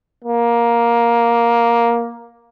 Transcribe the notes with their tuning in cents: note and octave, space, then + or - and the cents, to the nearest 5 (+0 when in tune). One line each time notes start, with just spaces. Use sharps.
A#3 +10